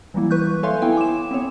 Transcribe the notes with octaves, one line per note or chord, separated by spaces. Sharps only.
E3 F#3 G3 A#3 E4
B4 C#6 F#6 G6
A4 C#5 E5 F5 G#5 C6
B3 E4 G5 G#5
D6 E7
B3 C4 C#5